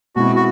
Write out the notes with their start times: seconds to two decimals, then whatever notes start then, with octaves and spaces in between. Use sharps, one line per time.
0.16 B2 G#3 C4 E4 F#4
0.36 F#4